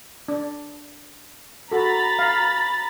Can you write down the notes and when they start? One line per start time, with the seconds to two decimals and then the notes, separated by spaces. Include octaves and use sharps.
0.28 D4
1.72 F#4 A4 A#5 B5 A6
2.19 F5